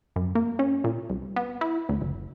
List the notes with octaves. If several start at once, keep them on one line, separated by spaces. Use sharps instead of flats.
F#2
A#3
C#4
A#2
C2
B3
E4
D2
F#1